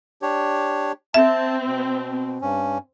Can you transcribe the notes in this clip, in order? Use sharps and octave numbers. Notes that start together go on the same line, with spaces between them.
D4 G4 C#5
C4 E5 A5
B2
G2 C#4